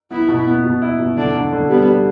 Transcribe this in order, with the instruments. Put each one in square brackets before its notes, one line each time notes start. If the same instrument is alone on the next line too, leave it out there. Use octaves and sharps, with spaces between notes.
[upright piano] B3 [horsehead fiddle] E4
[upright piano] B2
B3
B2
E4
B2
[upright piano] D3 [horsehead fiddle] D4
[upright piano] D3
D3
[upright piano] G3 [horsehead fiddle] B3
[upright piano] G3